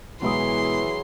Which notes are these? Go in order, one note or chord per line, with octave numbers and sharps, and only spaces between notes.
B2 E3 F#3 G#3 B3 E4 G#4 C6